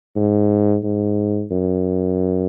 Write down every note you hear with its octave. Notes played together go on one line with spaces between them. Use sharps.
G#2
G#2
F#2